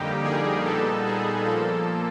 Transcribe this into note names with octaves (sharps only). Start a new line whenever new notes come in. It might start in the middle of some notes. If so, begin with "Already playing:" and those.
Already playing: F2 D3 G3 A#3 D#4 G4
G#4
A#2 G3 B3 D#4 A4
G#4
A#2 F3 A#3 A4